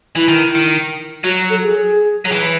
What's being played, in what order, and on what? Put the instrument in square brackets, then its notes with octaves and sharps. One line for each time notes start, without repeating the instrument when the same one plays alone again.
[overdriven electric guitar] E3 [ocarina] E4
[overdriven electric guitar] D#3
D#3
[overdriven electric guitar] F#3 [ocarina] F#4
[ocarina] A4
G#4
[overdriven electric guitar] F#3
E3